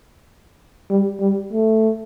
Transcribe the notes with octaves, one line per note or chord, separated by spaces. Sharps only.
G3
G3
A3